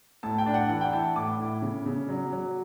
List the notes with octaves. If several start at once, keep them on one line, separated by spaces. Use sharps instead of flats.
A2 A5
G5
D4
F#5
E3 F#5
G5
E4 A5
A2 D6
E4
C#3
C#3
F#3
F#3